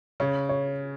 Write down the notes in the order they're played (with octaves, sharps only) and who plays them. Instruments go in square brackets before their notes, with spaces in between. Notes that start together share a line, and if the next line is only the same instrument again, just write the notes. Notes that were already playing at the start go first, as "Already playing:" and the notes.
[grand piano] C#3 [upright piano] C#5
[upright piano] C#5